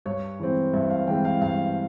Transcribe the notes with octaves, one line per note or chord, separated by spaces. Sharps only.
G2 C#5
E3 G#3 C4
G2 E5
F5
E3 G#3 C4 G5
F5
G2 F5